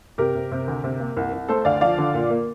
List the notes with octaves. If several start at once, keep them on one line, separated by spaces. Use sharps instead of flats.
C3 G4 A#4
C3
C3
D2
C3
A#3
C2
C2
A3 A4 C5
D2 D5 F5
F3 D5 F5
D3
A#2
A#3